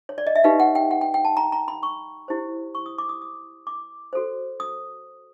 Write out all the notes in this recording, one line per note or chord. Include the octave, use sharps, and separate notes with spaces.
C#5
D5
D#5
E5
D#4 G4 B4 F5
F#5
G5
F#5
G5
G5
A5
A#5
A#5
B5
C#6
E4 G4 C5
C#6
D#6
D6
D#6
D#6
D6
F#4 A4 C5
D#6